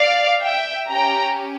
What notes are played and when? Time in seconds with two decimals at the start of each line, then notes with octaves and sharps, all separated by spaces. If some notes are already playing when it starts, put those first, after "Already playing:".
Already playing: D5 F5
0.41 E5 G5
0.89 C#4 G4 G5 A#5